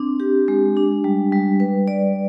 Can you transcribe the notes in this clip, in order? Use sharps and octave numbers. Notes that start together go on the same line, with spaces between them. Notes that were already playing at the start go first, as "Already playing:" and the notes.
Already playing: C4 D4
G4
G#3
D4
G3
G3
B4
D5